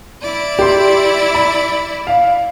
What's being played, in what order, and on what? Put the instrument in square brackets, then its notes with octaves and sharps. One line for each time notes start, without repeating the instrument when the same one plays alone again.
[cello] E4 D5
[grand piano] G4 C6
B5
F5